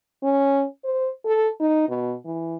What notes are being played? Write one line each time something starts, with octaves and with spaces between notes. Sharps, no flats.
C#4
C5
A4
D#4
B2
E3